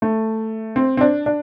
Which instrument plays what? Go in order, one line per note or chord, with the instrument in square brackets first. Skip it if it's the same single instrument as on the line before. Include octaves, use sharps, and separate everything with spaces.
[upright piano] A3
C4
C4
D4
D4